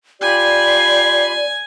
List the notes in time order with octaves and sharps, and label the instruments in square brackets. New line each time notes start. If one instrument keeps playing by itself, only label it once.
[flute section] F4 G4 B5 [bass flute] D5 [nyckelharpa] G#5